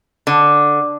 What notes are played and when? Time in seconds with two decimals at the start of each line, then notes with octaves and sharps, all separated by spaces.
0.27 D3